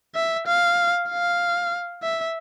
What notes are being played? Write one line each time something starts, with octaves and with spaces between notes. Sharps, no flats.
E5
F5
F5
E5